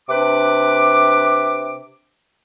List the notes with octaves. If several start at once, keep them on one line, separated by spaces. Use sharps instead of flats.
C3 D4 B4 D6